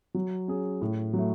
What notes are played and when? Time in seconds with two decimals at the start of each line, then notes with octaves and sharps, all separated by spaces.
0.14 F#3
0.48 C#4 G#4
0.82 A2
1.13 F#3
1.18 A3